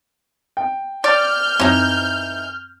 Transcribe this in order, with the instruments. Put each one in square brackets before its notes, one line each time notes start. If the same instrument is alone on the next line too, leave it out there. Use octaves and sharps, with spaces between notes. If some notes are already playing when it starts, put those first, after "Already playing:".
[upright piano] G5
[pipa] D5 [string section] F6 G6
[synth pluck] F#2 C4 [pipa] E3 D#4